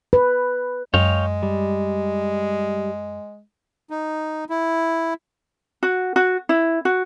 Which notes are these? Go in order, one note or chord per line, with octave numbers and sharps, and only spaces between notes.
B4
F#2 G#3 C#5 F5 G5
G3
D#4
E4
F#4
F#4
E4
F#4